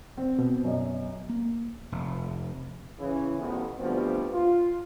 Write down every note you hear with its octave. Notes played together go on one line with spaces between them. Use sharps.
C4
B2
F#2 D#5
A#3
F1
C#3 E3
A1 F2 B3
D2 B2 F3 G3 B3 C4
F4